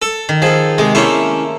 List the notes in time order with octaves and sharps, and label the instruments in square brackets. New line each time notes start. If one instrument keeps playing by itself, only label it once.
[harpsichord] A4
[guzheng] D#3
[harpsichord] F3 [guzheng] G#4 A4
[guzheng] C3 [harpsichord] G#3
[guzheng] A3 A#3 C5 [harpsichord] C#4 E4